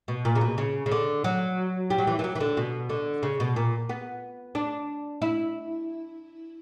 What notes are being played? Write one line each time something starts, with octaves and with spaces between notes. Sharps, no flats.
B2
A#2
C#3
B2
C#3
C#3
D3
F#3
G3
F#3
E3
E3
F#3
E3
D3
B2
D3
C#3
B2
A#2
B3
D4
E4